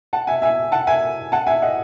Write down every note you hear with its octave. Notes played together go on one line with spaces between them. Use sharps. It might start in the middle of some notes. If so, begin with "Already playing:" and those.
F#5 A5
E5 G#5
E5 G#5
F#5 A5
E5 G#5
F#5 A5
E5 G#5
D#5 F#5